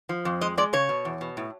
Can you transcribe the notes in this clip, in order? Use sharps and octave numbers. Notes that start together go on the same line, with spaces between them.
F3
F2
G#3 D#5
G#3 D5
C#3 C#5
B2
E2
B2
A2